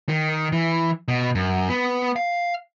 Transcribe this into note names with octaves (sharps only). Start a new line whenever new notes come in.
D#3
E3
B2
F#2
B3
F5